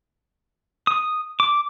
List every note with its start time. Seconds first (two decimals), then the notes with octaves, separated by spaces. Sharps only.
0.87 D#6
1.40 D6